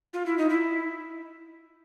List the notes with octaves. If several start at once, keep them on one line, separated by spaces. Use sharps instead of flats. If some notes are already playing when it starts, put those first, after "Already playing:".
F4
E4
D#4
E4